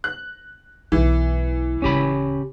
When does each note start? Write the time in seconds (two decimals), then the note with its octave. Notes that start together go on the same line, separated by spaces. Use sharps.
0.04 F#6
0.92 B1 E3 E4
1.82 D1 C#3 C#4 G4 B5